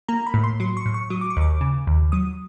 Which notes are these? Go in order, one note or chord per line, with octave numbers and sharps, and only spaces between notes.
A#3 A#5
B5
A2
C6
F#3 C6
C#6
A2
C#6
F#3 D#6
D6
C#6
D#2 D6
C#3
D#2
F#3 D#6